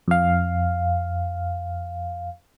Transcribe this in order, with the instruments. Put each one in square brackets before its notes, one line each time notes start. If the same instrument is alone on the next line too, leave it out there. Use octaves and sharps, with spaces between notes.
[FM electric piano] F2 F5